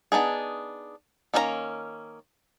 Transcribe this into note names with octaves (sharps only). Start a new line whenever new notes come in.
B3 D4 D#4 G#4
D#3 A#3 C#4 F#4 A#5